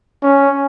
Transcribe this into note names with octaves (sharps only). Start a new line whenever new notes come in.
C#4